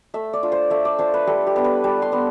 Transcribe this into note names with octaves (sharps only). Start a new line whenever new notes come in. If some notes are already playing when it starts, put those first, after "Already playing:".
A3 E5
D5
D4 F4
C5
A3 E5
D5
D4 F4 C5
B4
G3 A4
G4
B3 D4
B4
G3 A5
C6
B3 D4